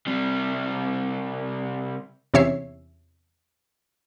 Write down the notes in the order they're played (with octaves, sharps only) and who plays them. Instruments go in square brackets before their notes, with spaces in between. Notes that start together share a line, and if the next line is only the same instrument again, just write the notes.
[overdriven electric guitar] C3 G3
[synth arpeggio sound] E2 C3 C#4 C#5 E5 C7